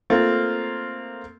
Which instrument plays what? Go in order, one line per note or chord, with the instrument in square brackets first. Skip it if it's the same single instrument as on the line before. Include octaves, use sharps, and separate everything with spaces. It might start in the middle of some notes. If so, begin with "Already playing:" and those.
[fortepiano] A3 A#3 C4 F4